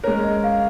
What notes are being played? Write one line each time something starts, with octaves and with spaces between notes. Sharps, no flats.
G#3 C#4 A#4 C#5
D#5
F5